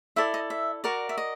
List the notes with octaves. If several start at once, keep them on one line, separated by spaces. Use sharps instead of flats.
E4 A4 D5 E5
D#5
E5
F#4 A#4 D5
E5
D#5